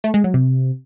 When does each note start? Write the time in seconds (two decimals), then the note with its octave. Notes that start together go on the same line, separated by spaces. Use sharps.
0.04 A3
0.14 G#3
0.24 F#3
0.34 C3